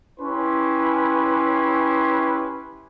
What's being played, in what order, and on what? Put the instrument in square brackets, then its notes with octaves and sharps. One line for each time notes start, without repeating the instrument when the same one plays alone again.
[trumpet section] C#4 E4 G4 B4 C6